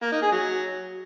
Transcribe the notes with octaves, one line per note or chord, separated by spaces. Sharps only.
A#3
D#4
G#4
F#3